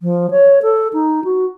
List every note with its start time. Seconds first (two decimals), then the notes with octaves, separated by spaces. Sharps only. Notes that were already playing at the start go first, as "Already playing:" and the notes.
0.01 F3
0.31 C#5
0.62 A4
0.93 D#4
1.24 F#4